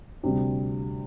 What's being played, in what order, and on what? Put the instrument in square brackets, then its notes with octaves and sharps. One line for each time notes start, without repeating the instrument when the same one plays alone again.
[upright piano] D2 C3 G3 C4